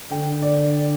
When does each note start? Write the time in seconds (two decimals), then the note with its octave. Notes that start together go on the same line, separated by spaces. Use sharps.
0.11 D3 G5
0.42 D5